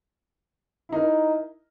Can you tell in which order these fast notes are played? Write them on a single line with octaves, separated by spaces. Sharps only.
E4 D#4 A#4